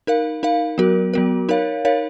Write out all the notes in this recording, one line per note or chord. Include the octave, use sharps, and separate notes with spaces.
D#4 A#4 F5
D#4 A#4 F5
F#3 B3 F#4 A#4
F#3 B3 F#4 A#4
D#4 A#4 C#5 F5
D#4 A#4 C#5 F5